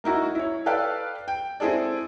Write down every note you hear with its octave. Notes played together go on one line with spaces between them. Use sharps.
A#3 D#4 E4 F#4
E4 C#5
A4 B4 D5 F5 G5
G5
C4 E4 G#4 A4 D5